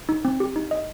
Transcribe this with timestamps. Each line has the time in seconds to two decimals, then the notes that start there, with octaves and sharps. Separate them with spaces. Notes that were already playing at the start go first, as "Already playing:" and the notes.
0.09 D#4
0.25 C4
0.40 G4
0.56 D#4
0.71 D#5